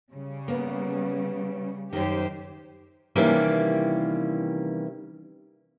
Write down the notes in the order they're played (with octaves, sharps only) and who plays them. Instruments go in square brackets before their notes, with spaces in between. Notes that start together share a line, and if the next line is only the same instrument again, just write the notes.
[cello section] C#3 G3
[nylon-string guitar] A#3 B3
[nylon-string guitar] F#2 D#3 [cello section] G4 C5
[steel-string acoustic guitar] C3 D#3 E3 G3 A#3 C#4